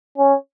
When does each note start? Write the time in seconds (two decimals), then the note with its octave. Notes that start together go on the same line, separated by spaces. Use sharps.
0.18 C#4